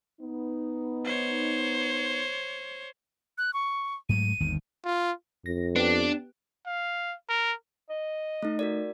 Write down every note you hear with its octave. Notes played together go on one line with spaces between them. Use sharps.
B3 D#4
C5 C#5
F#6
C#6
G#2 F#3 A3 D#7
G1 D#2 D#3
F4
F2 A#6
B3 D4 G4
F5
A#4
D#5
A3 D#4
F#4 A#4 D5